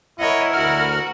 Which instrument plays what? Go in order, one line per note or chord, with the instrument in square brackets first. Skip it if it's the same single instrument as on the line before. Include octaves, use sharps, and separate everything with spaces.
[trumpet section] E4 [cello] A#4 F#5 [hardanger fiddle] C#5 D#5
[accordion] D2 F6 [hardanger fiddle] F#4